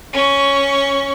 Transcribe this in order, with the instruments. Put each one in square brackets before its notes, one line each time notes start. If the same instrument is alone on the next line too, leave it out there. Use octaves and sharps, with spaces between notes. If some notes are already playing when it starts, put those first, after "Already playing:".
[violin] C#4 C#6